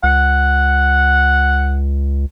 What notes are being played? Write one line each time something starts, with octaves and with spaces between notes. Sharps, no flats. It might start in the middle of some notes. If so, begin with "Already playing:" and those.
C#2 F#5